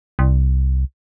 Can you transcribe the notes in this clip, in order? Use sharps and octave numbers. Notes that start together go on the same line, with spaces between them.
C2